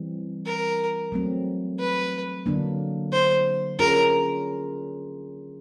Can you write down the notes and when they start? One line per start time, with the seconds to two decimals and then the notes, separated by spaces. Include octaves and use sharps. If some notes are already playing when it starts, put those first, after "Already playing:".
Already playing: E3 G3 C4
0.46 A#4
1.12 F#3 A3 C4
1.80 B4
2.46 D3 F#3 A#3 D4
3.12 C5
3.79 C#4 F4 G#4 A#4